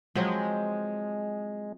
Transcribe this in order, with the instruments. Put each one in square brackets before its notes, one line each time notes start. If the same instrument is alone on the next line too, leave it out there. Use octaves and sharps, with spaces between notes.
[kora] F3 F#3 C4 [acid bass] G#3